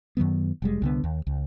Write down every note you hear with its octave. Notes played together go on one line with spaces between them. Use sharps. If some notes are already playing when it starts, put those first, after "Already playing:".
F#2 D#3 F#3 B3
F1 G3 G#3
C2 D3 B3
D#2
C#2